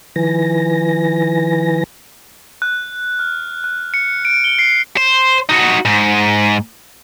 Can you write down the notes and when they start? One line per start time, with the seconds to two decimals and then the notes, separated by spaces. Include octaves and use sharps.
0.16 D#3 F3 E4 B4 G#5 A#6
2.62 F#6
3.19 F6
3.64 F#6
3.94 C#7
4.25 D7
4.44 G7
4.59 C7
4.97 C5
5.49 D#4 F#4
5.85 G#2